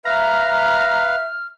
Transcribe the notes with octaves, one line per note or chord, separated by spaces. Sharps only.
B4 E5 F5 A#5 F6